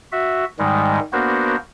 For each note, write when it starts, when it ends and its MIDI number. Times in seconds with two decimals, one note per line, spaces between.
0.12 0.45 66
0.12 0.45 76
0.59 0.99 44
0.59 0.99 51
0.59 0.99 55
0.59 0.99 56
1.13 1.56 58
1.13 1.56 59
1.13 1.56 62
1.13 1.56 66
1.13 1.56 70
1.13 1.56 72